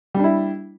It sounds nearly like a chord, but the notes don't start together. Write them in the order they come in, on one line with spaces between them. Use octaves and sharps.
G3 D4 E4